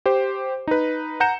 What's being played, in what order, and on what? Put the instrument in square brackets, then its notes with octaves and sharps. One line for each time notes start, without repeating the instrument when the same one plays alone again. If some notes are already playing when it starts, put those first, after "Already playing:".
[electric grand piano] G4 C5
D#4 B4
F#5 A#5 G6 C#7 E7